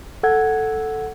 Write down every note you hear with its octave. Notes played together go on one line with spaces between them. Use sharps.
A4 F#5 G#6